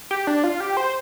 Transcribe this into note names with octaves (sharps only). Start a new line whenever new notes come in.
G4
D4
F4
G4
C5